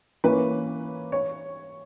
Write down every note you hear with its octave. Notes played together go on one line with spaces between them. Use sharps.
E3 A#3 C#4 B4
C#5